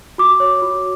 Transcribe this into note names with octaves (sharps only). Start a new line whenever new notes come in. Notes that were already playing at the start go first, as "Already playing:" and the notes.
F#4 D6
C#5
F#4